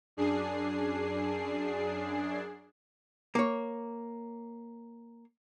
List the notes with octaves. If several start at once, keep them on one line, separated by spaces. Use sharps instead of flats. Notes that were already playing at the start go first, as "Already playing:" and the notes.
F#2 D4 G#4 C7
A#3 C#5